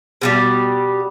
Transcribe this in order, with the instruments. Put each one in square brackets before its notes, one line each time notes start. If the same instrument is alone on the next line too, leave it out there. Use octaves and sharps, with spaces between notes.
[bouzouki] B2 F3 G3